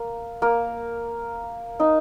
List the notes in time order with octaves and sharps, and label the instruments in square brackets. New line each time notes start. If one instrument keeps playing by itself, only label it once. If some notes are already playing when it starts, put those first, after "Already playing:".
Already playing: [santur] A#3
A#3
D#4